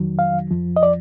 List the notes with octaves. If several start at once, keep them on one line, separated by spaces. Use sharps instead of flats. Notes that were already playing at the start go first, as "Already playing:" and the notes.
Already playing: F2 D#3 F#3
F5
F2 F3
D#5
D5